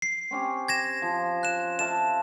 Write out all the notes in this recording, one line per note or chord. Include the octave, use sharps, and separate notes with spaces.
C7
C4 C#4 G4
G#6 A#6 E7
F3
F#6 E7
E5 F5 A5 E7